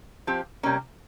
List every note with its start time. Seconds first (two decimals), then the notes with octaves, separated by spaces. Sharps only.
0.27 F3 C4 G4
0.63 C3 G3 A#3 C#4